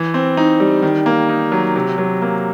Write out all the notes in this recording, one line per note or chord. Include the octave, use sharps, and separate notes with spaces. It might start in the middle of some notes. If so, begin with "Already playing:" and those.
Already playing: E3
C4
D#4
G3
D#3
A#3
D#4
F#3
C3
F#3
A#3